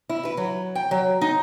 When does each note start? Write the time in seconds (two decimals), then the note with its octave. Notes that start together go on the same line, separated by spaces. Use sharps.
0.09 E4
0.25 B4
0.37 F#3
0.75 G5
0.91 F#3
1.21 D#4